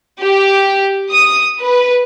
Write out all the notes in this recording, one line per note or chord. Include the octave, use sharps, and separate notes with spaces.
G4
D#6
B4